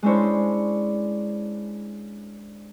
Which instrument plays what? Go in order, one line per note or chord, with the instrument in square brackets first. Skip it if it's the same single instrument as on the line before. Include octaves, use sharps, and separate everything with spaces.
[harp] G#3 C#4 D4 E4 C5 C#5